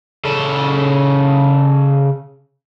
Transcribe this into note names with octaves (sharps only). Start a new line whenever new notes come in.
C#3 A4